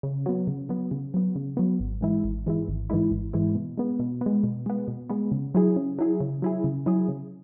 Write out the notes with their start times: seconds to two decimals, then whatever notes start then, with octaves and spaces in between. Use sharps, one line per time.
0.03 C#3
0.26 F#3 B3
0.47 C#3
0.69 F#3 B3
0.91 C#3
1.14 F#3 B3
1.36 C#3
1.57 F#3 B3
1.80 G#1
2.01 G#2 E3 G#3 E4
2.24 G#1
2.46 G#2 E3 G#3 E4
2.68 G#1
2.90 G#2 E3 G#3 E4
3.11 G#1
3.33 G#2 E3 G#3 E4
3.55 B2
3.77 G#3 B3
3.99 B2
4.21 G#3 B3
4.44 B2
4.66 G#3 B3
4.88 B2
5.10 G#3 B3
5.32 C#3
5.54 F#3 E4 G#4
5.76 C#3
5.99 F#3 E4 G#4
6.20 C#3
6.42 F#3 E4 G#4
6.64 C#3
6.86 F#3 E4 G#4
7.08 C#3